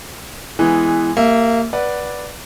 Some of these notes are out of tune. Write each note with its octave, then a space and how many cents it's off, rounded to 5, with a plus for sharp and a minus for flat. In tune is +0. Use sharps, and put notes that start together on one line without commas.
E3 +0 G#3 -5 B3 +0
A#3 -20 G4 +5 E5 +0
B4 -10 D5 +0 F#5 +0